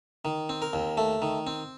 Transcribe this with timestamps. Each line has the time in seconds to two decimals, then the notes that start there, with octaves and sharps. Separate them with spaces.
0.25 D#3
0.49 C4
0.62 A#4
0.73 D#2
0.97 A3
1.22 D#3
1.47 C4